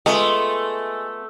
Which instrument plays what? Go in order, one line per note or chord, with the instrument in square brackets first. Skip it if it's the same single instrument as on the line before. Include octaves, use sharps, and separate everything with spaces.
[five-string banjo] G#3 [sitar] A3 [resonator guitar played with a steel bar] B3 F4